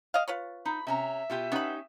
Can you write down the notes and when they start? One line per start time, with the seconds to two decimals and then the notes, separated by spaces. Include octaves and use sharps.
0.14 D#5 F5
0.28 F4 B4 C#5
0.65 D#4 B5
0.87 C3 C#4 E5 A#5
1.30 B2 F4 G4
1.52 B3 C#4 D#4 G4 B5